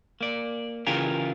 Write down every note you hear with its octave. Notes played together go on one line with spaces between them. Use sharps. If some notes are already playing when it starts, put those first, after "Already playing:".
A#3 D5
C#3 E3 F4 G4 G#4 A#4